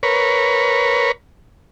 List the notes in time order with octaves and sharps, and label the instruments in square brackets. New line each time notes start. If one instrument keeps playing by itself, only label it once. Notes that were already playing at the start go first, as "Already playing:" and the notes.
[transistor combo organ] A#4 B4 C#5